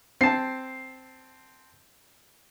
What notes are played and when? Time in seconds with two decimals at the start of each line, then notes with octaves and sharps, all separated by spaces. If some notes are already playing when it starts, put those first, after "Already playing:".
0.21 C4 A5 C7